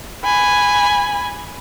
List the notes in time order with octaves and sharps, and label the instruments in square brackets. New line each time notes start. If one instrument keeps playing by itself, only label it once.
[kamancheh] G#5 B5